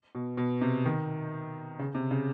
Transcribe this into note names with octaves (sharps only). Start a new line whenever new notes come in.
B2
B2
C3
D#3
C#3
C3
C#3